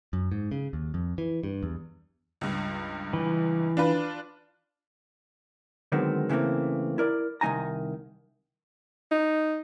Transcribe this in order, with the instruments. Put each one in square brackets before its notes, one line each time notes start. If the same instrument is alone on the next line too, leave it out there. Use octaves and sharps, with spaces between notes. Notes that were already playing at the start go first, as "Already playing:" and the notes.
[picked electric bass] F#2
G#2
C#3
D#2
F2
E3
G2
E2
[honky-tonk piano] C#2 G2
[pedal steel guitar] E3
[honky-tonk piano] D4 F4 B4
[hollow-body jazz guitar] D3 D#3 F#3 G#3 B3 C4
C#3 E3 A3 A#3 C4
E4 A#4 D5
C2 D#3 F#3 D#4 G#5 A#5
[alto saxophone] D#4